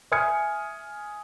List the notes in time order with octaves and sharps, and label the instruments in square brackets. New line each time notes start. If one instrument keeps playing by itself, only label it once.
[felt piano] E5 G#5 D#6 F6 G#6 C#7